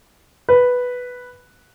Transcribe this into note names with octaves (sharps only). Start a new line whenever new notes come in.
B4